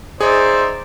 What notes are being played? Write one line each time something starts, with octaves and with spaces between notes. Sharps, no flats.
D#4 G#4 C5 D5 E5